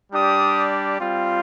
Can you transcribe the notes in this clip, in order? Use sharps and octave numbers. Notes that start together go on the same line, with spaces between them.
G3 D4 G4 D#6
G3 C4 F4